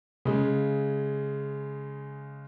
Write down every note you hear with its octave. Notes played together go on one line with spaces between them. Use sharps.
C#3 G#3